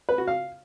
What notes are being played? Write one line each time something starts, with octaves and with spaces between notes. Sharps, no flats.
B4
F#4
F5